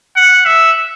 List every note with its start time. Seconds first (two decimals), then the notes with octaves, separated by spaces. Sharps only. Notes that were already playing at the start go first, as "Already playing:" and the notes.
0.16 F#5
0.46 E5